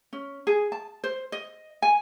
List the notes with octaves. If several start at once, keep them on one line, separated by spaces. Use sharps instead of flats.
C#4
G#4
A5
C5
D#5
G#5